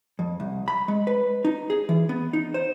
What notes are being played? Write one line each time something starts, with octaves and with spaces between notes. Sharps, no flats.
F2
C2
B5
G#3
B4
D#4
G#4
E3
B3
D#4
C5